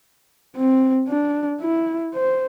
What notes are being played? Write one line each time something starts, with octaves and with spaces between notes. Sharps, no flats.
C4
D4
E4
C5